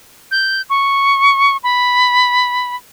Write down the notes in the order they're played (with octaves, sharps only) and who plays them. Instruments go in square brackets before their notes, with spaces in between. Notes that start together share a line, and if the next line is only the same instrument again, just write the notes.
[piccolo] G6
C#6
B5